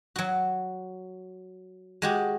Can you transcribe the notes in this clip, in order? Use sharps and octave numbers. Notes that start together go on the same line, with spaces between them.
F#3 F#4
G#3 F#4 G4